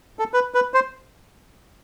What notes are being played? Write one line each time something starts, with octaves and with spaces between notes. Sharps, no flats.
A4
B4
B4
C5